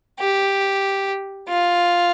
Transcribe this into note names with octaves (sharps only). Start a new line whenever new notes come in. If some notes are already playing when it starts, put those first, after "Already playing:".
G4
F4